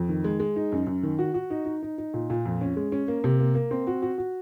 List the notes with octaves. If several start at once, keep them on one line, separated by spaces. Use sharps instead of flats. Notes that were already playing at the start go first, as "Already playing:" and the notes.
Already playing: F2
D#3
G#3
G#3
D#4
F#2
F#2
D#3
F#4
F#4
D#4
D#4
D#4
D#4
A#2
A#2
F2
C#4
G#3
C#4
A#3
C3
A#3
A#3
C4
F#4
F#4
F#4